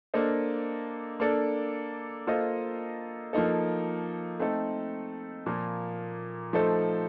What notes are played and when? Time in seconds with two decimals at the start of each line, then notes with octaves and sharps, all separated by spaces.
0.14 A#3 D4 A4 C5 D#5
1.20 A#3 D4 A4 D5
2.27 A#3 F4 A4 C5 D#5
3.33 F3 A#3 D#4 A4
4.40 A3 C4 D#4 A4
5.46 A#2 F3 A#3
6.53 F3 A3 D#4 A4 C5